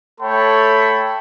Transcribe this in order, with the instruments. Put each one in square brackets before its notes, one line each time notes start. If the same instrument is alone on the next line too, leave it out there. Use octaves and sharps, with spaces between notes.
[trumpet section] A3 A4 C#5 G5 B5